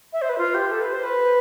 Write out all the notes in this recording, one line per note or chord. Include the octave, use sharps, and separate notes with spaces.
E5
C5
B4
F4
G4
A4
B4
C5
B4